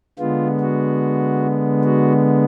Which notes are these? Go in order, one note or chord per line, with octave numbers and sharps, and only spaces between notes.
D3 G#3 B3 F4
F#4
F#4